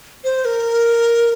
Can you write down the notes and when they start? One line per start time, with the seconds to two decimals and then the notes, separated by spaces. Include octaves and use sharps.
0.24 C5
0.45 A#4